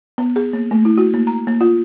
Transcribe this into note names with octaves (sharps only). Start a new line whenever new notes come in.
B3
G#4
A#3
A3
E4
F#4
A#3
A#5
A#3
F4